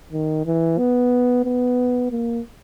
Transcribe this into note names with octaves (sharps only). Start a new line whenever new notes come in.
D#3
E3
B3
B3
A#3